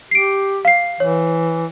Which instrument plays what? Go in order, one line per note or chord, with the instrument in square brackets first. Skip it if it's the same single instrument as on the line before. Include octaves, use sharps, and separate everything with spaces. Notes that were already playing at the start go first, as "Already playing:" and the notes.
[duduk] G4 [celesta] C7 D7
[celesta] F5 C7
[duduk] E3 [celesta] C#5